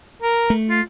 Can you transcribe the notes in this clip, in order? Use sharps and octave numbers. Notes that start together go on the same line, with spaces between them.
A#4
A3
F4